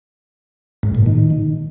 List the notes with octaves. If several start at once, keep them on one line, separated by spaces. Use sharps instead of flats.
G#2
A#2
D#3